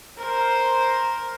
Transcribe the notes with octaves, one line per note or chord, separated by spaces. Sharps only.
A#4 C5